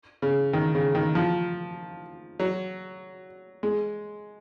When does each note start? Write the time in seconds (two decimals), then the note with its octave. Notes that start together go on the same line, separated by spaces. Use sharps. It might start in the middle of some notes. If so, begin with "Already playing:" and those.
0.22 C#3
0.53 D#3
0.75 C#3
0.95 D#3
1.15 F3
2.40 F#3
3.63 G#3